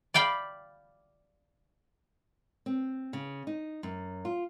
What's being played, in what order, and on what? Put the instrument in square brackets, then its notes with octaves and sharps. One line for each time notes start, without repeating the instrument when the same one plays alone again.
[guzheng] D5 F5 G5 B5
[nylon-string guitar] C4
C#3
D#4
F#2
F4